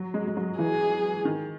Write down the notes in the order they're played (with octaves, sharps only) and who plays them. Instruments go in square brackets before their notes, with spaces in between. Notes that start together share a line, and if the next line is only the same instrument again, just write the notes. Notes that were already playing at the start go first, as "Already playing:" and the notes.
Already playing: [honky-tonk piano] F#3
G#3
G#3
F#3
[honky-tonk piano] E3 [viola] G#4
[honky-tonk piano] D#3